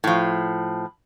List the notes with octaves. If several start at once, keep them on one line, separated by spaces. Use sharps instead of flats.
A2 F3